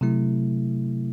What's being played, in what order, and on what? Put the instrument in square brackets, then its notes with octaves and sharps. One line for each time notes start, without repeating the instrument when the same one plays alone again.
[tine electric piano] C3 F#3 A3 E4